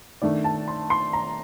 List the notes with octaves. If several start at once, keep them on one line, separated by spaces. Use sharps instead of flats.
D#3 A3 D4 D5
A5
C6
C6
A#5